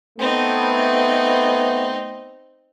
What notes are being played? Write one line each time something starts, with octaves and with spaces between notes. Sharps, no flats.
A3 B3 C4 D#4